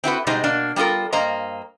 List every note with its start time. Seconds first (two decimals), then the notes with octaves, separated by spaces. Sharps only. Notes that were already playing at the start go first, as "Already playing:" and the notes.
0.04 C4 E4 F#4 B4
0.27 B2 G3 G#3 D#4 C5
0.44 B2 A#3 D4
0.76 G3 B3 F4 A4 A#4
1.13 G2 A#3 C5 D#5 A#5